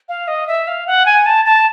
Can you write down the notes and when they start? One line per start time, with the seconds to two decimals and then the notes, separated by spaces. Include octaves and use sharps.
0.09 F5
0.28 D#5
0.47 E5
0.67 F5
0.87 F#5
1.06 G#5
1.26 A5
1.45 A5